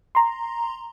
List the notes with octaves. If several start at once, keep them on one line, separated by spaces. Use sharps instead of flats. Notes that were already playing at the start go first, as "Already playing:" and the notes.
A#5 C6